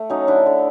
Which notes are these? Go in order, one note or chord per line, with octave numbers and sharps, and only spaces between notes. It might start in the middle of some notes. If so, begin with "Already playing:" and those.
Already playing: A3
F#3 C#4 D#4
D3 D4 E4
D3